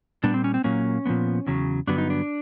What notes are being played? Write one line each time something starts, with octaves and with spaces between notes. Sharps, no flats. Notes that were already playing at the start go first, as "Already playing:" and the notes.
A#2 G3 B3 D4
C4
C#4
C4
A#2 F#3 A#3 C#4
A#2 F3 G#3 B3
E2 C#3 F#3
G2 D3 F#3 B3 D4
D#4
D4